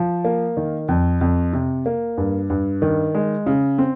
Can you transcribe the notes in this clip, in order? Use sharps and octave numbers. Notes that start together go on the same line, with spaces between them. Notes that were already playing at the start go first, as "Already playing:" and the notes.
Already playing: F3
A#3
D#3
F2
F2
C3
A#3
G2
G2
D#3
G#3
C#3
C4